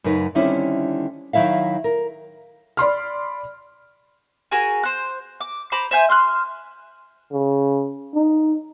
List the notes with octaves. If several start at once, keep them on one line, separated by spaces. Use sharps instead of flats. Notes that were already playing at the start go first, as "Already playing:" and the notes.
F#2 C#3 F#3 D#4 B4
D3 D#3 G3 C4 C#4 E4
D#3 F#3 E4 E5 F5
A#4
D5 B5 C6 F6
F#4 G#4 A#4 G#5
C5 F#6
D6
C5 A#5 B5 D6
C5 E5 G#5 G6
C6 F6 F#6
C#3
D#4